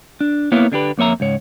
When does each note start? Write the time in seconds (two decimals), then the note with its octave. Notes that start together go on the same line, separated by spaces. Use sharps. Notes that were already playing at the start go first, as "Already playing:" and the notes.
0.21 D4
0.52 A#3 B3 E4 C#5 F5
0.72 D3 D4 G4 B4
0.98 F2 A#3 C#5 E5 A#5
1.20 C#2 G#2 C#5